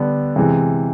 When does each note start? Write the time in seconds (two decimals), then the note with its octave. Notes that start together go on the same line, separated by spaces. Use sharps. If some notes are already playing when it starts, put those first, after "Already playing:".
Already playing: D3 G3 B3 D4
0.36 C3 E3 G#3